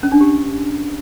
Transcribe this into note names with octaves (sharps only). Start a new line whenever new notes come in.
C#4
D4
G4